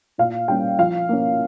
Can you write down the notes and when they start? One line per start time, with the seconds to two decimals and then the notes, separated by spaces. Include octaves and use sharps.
0.18 A#2 F5
0.48 G3 A#3 C#4 G5
0.78 F3 F5
1.09 A#3 C#4